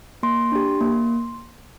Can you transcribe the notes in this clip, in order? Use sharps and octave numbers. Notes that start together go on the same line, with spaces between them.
A#3 C6
D4 G4
A#3